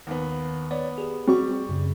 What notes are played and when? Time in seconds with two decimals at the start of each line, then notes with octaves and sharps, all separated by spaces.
0.07 D#2 B3
0.71 B3 C#5 D5
0.98 G4 G#4
1.28 G3 C4 F#4 C#6
1.69 F#2 C#3